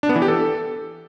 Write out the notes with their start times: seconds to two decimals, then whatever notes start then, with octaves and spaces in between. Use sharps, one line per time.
0.03 D4
0.09 B3
0.16 E3
0.22 G4
0.28 A4